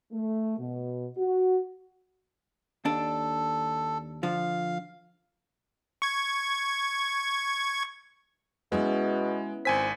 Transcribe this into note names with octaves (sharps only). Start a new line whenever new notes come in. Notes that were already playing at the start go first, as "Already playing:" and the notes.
A3
B2
F#4
D#2 D4 A4
D3 F3 F5
C#6 G#6
B2 G#3 B3 C#4 E4
G#1 C4 G#5 B6